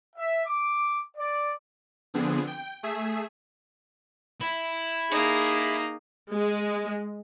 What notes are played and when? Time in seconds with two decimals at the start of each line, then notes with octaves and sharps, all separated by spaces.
0.16 E5
0.45 D6
1.17 D5
2.14 D3 F3 B3 C4 D4 G#4
2.47 G5
2.83 A3 G#4 E5
4.41 E4
5.12 A#3 D#4 G#4
6.33 G#3